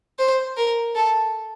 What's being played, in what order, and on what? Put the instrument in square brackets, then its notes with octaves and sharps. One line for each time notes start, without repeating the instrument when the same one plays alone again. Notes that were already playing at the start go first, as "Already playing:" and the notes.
[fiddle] C5
A#4
A4